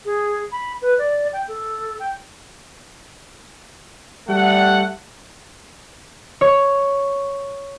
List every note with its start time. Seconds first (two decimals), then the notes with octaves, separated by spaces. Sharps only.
0.05 G#4
0.52 B5
0.82 B4
0.98 D5
1.33 G5
1.48 A4
2.00 G5
4.28 G3 A3 F#5
6.41 C#5